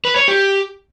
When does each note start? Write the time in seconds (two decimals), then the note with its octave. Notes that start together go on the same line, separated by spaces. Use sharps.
0.05 B4
0.16 C#5
0.28 G4